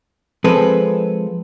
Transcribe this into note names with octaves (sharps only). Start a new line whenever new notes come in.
F3 G#3 C4 A4 B4